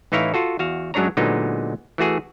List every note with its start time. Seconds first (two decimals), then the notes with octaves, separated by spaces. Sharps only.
0.12 A1 E3 D#4 E4 C#5 F5
0.34 F4 F#4 A4
0.59 E2 F#4 F5
0.94 F#2 F#3 G#3 D4 C#5 A#5
1.17 A#2 D3 F#3 G#3 B3 D#4
1.98 E3 A3 F#4 G#4